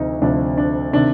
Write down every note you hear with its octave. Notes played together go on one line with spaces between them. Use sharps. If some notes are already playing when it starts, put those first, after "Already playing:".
Already playing: D2 C3 F3 D#4
D2 C3 F3 D4
D4
C3 D#3 D4